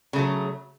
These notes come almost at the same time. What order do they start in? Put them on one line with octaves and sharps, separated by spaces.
C#3 A3 F#3